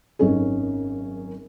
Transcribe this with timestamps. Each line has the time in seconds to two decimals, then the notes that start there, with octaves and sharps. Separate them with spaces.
0.19 G#1 F#2 C#4 D#4 G#4